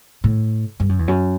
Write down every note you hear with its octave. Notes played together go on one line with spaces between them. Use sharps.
A2
G2
F#2
E2
F#2